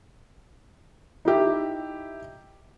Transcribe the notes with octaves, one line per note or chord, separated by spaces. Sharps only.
D#4 E4 G4 E5